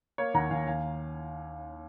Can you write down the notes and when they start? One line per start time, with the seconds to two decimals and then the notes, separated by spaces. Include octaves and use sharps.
0.18 A#3 C#5 F5
0.34 D#2 F#5 A#5
0.51 D#2 F5 G#5
0.67 D#2 F5 G#5